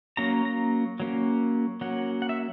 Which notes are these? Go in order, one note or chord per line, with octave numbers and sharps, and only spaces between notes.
F#3 A#3 C#4 A#5
A#5
F#3 A#3 C#4
F#3 A#3 C#4 F#5
F#5
E5